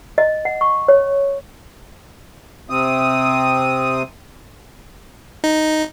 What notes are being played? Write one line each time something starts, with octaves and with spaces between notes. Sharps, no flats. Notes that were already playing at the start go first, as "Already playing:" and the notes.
D#5
F#5
C#6
C#5
C3 C4 D#6
D#4